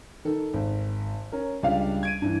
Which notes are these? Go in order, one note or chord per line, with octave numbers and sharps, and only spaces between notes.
D#3 A4
G#1
C#4 A#4
C#2 G3 D4 F5
G#6 D7 D#7
G2 E3